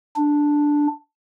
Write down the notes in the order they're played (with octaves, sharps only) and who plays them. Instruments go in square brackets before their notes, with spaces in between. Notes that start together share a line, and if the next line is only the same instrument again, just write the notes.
[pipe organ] D4